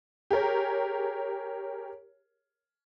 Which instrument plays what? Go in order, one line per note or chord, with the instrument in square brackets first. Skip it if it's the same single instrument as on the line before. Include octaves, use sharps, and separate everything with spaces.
[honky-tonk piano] G4 G#4 A#4 C#5